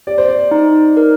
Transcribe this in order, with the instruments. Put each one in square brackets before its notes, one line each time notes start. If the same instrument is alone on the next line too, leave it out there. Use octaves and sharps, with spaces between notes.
[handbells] G4 [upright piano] D5
[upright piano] C5
D5
[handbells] D#4
A#4